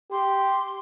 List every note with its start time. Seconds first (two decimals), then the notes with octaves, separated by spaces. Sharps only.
0.12 G4 C6